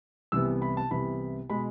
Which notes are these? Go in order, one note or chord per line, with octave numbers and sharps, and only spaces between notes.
C2 C3 E3 B3 E6
B5
A5
C2 C3 E3 B3 B5
B2 G#3 B5